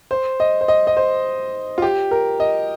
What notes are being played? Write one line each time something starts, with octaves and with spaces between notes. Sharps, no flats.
C5
D#5
C5
D#5
D#5
C5
F4
G4
A#4
D#5